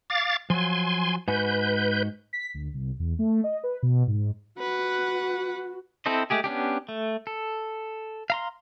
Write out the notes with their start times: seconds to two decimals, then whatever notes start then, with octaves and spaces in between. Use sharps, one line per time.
0.10 F5 D6 A6
0.50 F3 F#3 G#5 C6
1.28 G#2 F#4 B4 G#5 G6
2.33 B6
2.54 D2
2.74 C2
2.99 E2
3.19 A3
3.44 D#5
3.64 B4
3.83 B2
4.07 G#2
4.59 F#4 B4 F#5
6.06 C4 E4 A4 C5 D#5
6.30 G#3 A3 G4 G#4
6.44 B3 C#4 D4 G4
6.89 A3
7.27 A4
8.30 F5 A#5 C6